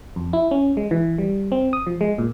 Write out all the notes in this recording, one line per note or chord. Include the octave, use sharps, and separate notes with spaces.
F2
E4
C#4
G#3
E3
G3
C4
D#6
F3
G#3
A#2